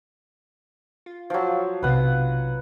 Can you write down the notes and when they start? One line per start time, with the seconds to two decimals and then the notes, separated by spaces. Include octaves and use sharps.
1.06 F4
1.30 F3 F#3
1.82 B1 C3 F4 B4 F#5